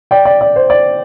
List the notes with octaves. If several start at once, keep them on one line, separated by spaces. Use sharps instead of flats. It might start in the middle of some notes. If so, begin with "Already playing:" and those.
D5 G5
D5
D5
C5
D5